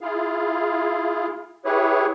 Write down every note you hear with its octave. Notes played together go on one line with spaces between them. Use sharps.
E4 F4 G#4 F5
E4 G4 G#4 B4 C#5